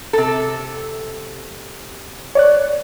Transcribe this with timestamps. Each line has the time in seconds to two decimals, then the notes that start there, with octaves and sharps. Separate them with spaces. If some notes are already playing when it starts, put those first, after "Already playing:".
0.13 C3 A4
2.35 C#5 D5 F#6